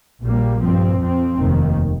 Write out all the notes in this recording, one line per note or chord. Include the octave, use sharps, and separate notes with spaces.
A#1 A#2 G3 A#3
G2 F3 C4
F2 F3 C4
F1 D#2 D#3